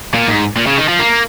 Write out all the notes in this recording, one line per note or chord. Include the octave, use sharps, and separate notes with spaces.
A#2
G#2
A#2
C#3
D#3
F3
A#3